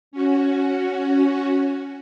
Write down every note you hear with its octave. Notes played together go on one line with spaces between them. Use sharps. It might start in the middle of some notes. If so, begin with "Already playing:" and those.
C#4 F#4